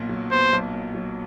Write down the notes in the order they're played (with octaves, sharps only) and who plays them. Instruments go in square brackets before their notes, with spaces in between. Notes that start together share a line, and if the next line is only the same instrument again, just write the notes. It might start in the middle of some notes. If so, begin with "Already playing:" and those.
Already playing: [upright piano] B1 A#2 B3
F#3
[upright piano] B3 [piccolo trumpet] C5
[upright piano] B1
A#2
F#3